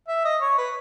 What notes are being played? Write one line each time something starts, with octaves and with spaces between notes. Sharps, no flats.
E5
D#5
C#5
B4